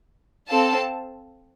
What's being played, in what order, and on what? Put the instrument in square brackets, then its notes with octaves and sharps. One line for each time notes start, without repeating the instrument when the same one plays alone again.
[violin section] C4 A4 F5 A5